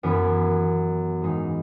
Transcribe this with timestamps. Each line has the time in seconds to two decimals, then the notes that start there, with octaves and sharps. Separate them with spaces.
0.03 F#2 E3 B3 E4
1.22 G#2 E3 G#3 D#4